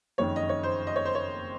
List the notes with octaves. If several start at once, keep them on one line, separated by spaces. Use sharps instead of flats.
F#1 F2 D#3 C#5
D#5
C#5
C5
D#5
C#5
C5
C#5